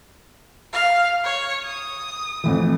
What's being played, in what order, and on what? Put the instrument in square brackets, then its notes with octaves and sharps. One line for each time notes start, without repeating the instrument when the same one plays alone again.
[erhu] F5
C#5
D#6
[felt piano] F2 A2 E3